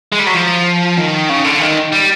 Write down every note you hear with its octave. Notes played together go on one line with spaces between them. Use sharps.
G#3
G3
F#3
F3
D#3
C#3
D3
D#3
G3